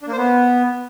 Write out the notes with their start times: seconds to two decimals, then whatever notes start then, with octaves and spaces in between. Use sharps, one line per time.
0.02 D4
0.07 A#3
0.13 C5
0.18 B3